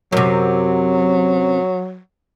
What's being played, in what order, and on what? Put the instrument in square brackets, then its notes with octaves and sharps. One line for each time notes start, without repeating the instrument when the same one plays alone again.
[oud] F#2 C3 [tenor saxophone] F#3